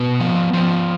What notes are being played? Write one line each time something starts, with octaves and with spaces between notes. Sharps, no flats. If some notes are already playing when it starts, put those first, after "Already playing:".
Already playing: B2 B3
F3
F3